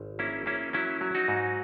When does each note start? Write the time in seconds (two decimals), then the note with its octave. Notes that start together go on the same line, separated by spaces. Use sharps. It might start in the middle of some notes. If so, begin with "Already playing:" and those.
Already playing: G#1
0.19 A#3 C#4 E4
0.46 A#3 C#4 E4
0.73 F#3 C#4 E4
1.01 F#3
1.15 D#4 F#4
1.28 G#2